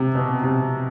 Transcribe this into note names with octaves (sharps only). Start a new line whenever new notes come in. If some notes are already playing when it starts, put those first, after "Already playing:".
Already playing: C3
B2
C3